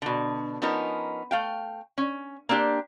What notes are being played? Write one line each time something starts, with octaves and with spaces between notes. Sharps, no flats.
B2 D3
F3 B3 C#4 D#4 A#4
A3 F5 G5
C#4
A#3 C4 D4 G4